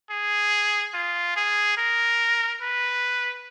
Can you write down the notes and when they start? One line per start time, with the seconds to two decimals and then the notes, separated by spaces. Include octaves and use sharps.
0.10 G#4
0.94 F4
1.36 G#4
1.78 A#4
2.61 B4